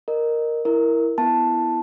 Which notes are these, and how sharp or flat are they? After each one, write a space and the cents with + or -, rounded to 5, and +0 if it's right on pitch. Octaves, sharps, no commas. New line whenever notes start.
A#4 +0 D#5 -20
E4 +0 A#4 +0
B3 +0 E4 +0 A5 +0